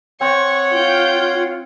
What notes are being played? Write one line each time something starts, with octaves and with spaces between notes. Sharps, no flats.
C4 C#5 F#5 C#6
F4 G5 G6